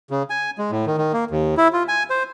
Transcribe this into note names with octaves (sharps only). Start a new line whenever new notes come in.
C#3
G#5
G#3
A2
D#3
D#3
A#3
D#2
E4
F4
G#5
C5